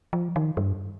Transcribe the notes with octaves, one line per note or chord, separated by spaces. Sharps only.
F3
D#3
G2